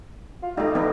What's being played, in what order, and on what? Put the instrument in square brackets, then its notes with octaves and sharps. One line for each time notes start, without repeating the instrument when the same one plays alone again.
[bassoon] F4
[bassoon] G3 [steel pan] A3 D#4
[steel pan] E3 B3 D#4